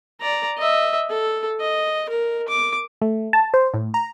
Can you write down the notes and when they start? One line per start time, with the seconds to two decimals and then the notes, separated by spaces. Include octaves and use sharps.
0.21 D5 A#5
0.58 D#5 E5
1.10 A4
1.60 D#5
2.09 A#4
2.48 D6
3.01 A3
3.33 A5
3.54 C5
3.74 A2
3.94 A#5